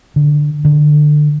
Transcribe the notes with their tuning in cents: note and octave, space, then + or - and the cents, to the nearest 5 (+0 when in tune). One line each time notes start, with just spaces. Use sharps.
D3 +0
D3 +25